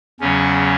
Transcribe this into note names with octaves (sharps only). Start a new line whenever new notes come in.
E2 C#3 F#3 C#4